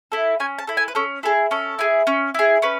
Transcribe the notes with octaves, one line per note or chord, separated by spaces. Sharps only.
E4 A4
C#4 G#5
A5
E4 A4
G#5
B4
C#4 A4
E4 G#4 A4
C#4 A4
E4 G#4
C#4
E4 G#4
C#4 B4